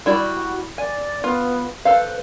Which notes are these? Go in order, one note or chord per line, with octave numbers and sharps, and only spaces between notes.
G3 E4 F#4 D5
D5 G#5
B3 F4
A4 B4 C5 F5